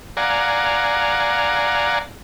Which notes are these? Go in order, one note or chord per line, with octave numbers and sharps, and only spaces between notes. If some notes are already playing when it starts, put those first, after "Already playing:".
D5 F5 F#5 G#5 A#5